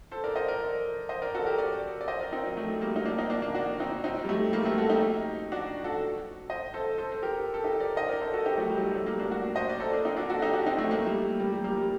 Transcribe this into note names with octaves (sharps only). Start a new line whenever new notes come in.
A4 C5
A#4 D5
C5 D#5
A#4 D5
C5 D#5
A#4 D5
F#4 A4
G4 A#4
A#4 D5
D5
C5 D#5
A#4 D5
C4 D#4
F#3
F#3 A3
G3 A#3
D#4
A#3 D4
C4 D#4
A#3 D4
A#3 D4
D4 F#4
C4 D#4
C4 D#4
G3
F#3 A3
G3 A#3
A3 C4
F#4 A4
D#4 G4
D4 F#4
F#4 A4
C5 D#5
A4 C5
A4 C5
C5
G4 A#4
A4
D#4 G4
A#4 D5
C5 D#5
A#4 D5
A4 C5
F#4 A4
D#4 G4
F#3 A3
G3
F#3
G3
F#3 A3
G3 A#3
A#3 D4
D4 F#4
C5 D#5
D5
A4 C5
A#3 D4
C4 D#4
D4 F#4
F#4 A4
D#4 G4
D4 F#4
C4 D#4
A3 C4
A#3
A3
G3 A#3
G3
G3
G3 A#3
G3